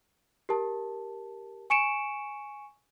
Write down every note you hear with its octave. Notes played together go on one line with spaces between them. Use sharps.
G4 A#4 A5
G#5 C#6 C#7 D7 E7